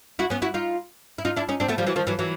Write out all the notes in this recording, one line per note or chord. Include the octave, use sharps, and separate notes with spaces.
E4 F#4
B3 C#4
E4 F#4
D#4 F4
E4
D#4 F4
D4 E4
C#4 D#4
C4 D4
A3 B3
F3 G3
E3 F#3
D#3 F3
E3 F#3
E3 F#3